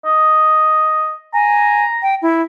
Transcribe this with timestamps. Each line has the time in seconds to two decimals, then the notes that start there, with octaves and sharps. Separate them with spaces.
0.06 D#5
1.34 G#5 A#5
2.02 G5
2.22 E4